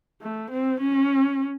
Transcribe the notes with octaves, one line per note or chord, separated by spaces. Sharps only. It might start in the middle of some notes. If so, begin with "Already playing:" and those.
A3
C4
C#4